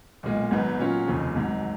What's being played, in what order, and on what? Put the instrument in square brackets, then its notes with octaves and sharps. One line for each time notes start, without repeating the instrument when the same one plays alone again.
[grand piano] B1 A#2 G#3
G#1 G#2 F#3 B3
A#2 F#3 C#4 F4
F1 D#2 C#3 F3
G#1 G#2 F#3